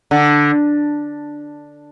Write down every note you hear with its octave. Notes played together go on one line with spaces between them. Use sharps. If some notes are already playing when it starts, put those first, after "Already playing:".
D3